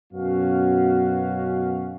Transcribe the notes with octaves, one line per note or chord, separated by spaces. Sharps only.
F#2 B2 B3 C#4 F#4 F5